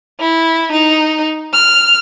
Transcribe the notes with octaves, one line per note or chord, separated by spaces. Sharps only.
E4
D#4
F6